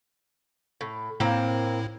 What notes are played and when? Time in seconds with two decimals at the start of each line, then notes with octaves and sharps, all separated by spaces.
0.81 A2
1.20 A2 A#3 C4 E4